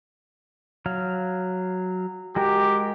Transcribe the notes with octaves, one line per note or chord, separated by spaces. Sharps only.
F#3 F5
G#3 F#4 G4 A#4